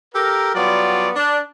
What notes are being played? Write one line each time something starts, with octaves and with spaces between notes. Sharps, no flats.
G4 A4 A#4
F#3 G3 B3 F4 D5
D4